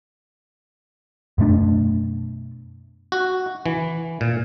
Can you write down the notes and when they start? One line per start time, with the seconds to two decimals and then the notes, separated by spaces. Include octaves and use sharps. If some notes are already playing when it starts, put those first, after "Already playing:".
1.38 F#2 B2 A3 D4
3.12 F#4
3.66 E3
4.21 A#2